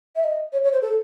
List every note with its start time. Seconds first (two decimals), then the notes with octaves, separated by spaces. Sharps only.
0.16 E5
0.24 D#5
0.53 C#5
0.64 C#5
0.73 C5
0.82 A4